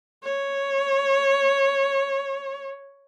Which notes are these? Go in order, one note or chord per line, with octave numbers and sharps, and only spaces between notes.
C#5